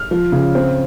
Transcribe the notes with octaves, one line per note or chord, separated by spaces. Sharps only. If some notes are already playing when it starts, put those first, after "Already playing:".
Already playing: F6
F3
C#3
C4